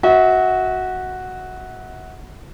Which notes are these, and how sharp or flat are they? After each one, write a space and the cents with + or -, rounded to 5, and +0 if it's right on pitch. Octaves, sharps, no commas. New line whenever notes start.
F#4 +0 E5 -40